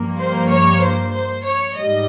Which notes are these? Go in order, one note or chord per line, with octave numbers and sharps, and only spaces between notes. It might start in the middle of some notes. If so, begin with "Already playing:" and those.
Already playing: G2 F3 A#3
C5
C#5
C5
C5
C#5
G#2 G3 D#5